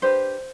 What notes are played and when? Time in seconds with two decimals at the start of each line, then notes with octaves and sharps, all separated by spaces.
0.02 D4 G4 B4 C5